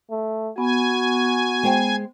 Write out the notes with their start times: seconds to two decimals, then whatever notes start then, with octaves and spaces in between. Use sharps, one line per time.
0.10 A3
0.58 B3 F#4 G#5
1.63 G#3 C5 G5